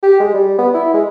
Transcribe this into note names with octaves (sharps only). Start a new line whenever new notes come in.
G4
G#3
G3
B3
E4
G#3